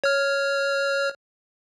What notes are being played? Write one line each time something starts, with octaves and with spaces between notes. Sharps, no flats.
C#5 F6